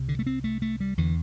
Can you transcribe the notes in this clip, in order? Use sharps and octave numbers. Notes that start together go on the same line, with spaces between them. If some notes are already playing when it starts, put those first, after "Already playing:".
Already playing: C2 C3
D3
A3
C4
A3
A3
G3
E2 D3 E3